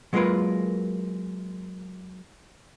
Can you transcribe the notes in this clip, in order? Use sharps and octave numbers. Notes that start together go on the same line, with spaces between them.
F#3 G#3 A#3 F4 A#4 B4